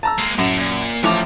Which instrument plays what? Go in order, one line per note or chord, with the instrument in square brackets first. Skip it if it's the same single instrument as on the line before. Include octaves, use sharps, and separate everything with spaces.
[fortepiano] A5 A#5 E6
[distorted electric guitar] G#3 A#3
[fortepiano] F#2 [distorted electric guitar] A2
[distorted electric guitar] A#2
[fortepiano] A1 F3 D6 [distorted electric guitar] C#4 A#5